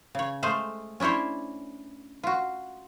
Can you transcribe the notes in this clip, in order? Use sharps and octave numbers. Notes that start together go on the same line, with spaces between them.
C#3 C#5
G#3 A3 C5 F5
C#4 D4 E4 C5 C#5
F4 F#4